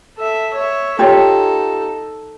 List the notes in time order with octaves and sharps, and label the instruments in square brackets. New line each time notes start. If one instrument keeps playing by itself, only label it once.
[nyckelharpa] A4 E5
C#5 E5
[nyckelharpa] D#4 A4 [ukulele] F4 G4 C#5